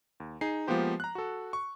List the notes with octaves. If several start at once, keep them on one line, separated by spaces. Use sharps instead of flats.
D#2
D#4 G#4 C7
F3 G#3 A#3 B3 G4 C5
A#5 F#6
F#4 A4
C#6